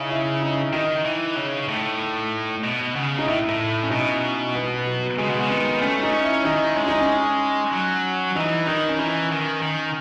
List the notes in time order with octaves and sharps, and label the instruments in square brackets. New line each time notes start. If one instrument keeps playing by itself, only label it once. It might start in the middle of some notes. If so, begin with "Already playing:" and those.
Already playing: [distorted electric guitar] C#3 [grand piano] D#4 E4
[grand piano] E4
D#4
[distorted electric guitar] D#3 [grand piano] D#4
[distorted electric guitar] E3
C#3
A2
B2
C#3
[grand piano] D#4
[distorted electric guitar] A2 [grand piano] E4
[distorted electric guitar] A2
[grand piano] C#4
[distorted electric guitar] B2 [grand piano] D#4
[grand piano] B3
F#3
[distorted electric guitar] C#3 [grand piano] G#3
[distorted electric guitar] B2
C#3
[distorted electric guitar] D#3 [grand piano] B3
[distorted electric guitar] A3 [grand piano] C#4
[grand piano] C#4
D#4
[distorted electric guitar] C#4
[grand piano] E4
[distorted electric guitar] D#3 [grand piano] D#4
[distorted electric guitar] G#3 [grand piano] C#4
[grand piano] D#4
C#4
[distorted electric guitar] F#3
[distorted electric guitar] E3 [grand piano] D#4
[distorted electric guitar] D#3 [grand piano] D#4
[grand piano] C#4
[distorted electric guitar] E3 [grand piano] D#4
[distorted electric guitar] D#3
D#3